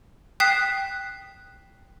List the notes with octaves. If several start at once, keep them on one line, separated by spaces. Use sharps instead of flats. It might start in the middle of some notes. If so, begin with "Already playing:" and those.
G5 D#6 F#6 B6 C7 E7